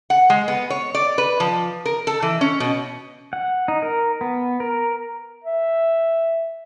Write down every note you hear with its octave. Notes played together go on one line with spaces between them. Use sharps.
F#5
G#3
B3
C#5
D5
B4
F3
A#4
A4
E3
C#4
B2
F#5
D#4
A#4
B3
A#4
E5